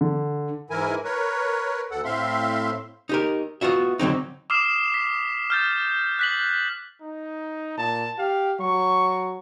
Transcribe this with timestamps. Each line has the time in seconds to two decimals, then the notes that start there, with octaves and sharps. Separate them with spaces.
0.01 D3
0.70 G#2 E3 E4 A#4 G#5
1.04 A#4 B4 C#5
1.91 D2 A4 F#5
2.05 A2 C4 E5 F5 C6
3.09 D#4 G4 A#4
3.61 B3 F4 F#4 E5
3.99 D3 F#3 C4 D#4
4.50 D6 D#6 F6 C7 E7
4.94 B6
5.50 F6 G6 A6
6.19 F#6 B6 F#7
7.01 D#4
7.78 A#2 A5
8.19 G4 F5
8.60 F#3 C#6